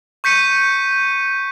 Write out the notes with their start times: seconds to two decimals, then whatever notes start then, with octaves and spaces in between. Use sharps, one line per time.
0.24 C#6 G6 B6 C#7 D#7